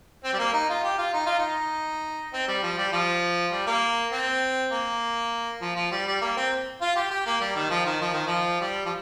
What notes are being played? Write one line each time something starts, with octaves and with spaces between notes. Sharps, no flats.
C4
G3
A#3
D#4
F4
G4
F4
D#4
F4
D#4
C4
G3
F3
G3
F3
G3
A#3
C4
A#3
F3
F3
G3
G3
A#3
C4
F4
G4
G4
A#3
G3
D#3
F3
D#3
F3
D#3
F3
G3
F3